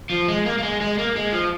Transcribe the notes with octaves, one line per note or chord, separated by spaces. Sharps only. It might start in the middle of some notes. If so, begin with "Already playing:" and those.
F3
G#3
A#3
A#3
G#3
G#3
A#3
G#3
F3